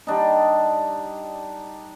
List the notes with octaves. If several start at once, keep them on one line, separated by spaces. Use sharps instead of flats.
G3 D4 D#4